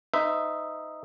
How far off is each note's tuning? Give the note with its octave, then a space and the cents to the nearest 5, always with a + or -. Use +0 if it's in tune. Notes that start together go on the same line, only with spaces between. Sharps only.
D#4 +0 C5 -40 E5 +0